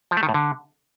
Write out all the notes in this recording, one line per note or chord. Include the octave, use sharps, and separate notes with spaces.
F3
A3
D#3
A2
D3